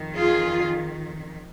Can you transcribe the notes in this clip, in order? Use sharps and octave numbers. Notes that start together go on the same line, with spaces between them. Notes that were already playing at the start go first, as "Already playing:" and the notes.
Already playing: F2 D#3
F4 G#4